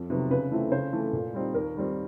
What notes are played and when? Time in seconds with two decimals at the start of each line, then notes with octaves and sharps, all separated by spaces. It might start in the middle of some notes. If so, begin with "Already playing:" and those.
Already playing: F2
0.10 C3 D#3 F#3 B3
0.30 C#3 B4
0.51 E3 A3 C4 E4
0.72 C#3 C5
0.93 E3 A3
1.13 A#2
1.34 G3 C4 D#4
1.54 D#2 A#4
1.75 D#3 G3 C4